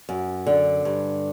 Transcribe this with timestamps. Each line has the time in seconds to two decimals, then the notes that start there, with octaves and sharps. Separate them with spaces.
0.09 F#2
0.47 D3
0.85 G2